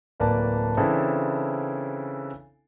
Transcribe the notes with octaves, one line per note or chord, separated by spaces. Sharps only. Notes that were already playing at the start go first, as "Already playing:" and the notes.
D1 A#3 B4 D5 A5
C#3 E3 C4 D4 E4 A4